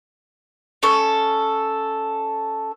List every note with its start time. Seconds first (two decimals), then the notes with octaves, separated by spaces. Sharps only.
0.83 C#4 A4